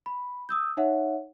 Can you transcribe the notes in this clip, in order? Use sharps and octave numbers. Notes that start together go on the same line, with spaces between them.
B5
D#6 E6 G6
D#4 C#5 E5 F#5